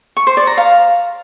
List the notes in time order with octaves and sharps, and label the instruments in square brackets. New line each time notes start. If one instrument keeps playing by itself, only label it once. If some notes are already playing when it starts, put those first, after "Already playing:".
[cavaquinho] C#6
C5
D5
A#5
F5